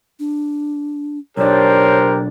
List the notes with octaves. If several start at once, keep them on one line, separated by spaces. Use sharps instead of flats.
D4
B1 D4 G4 A#4 C5 C#5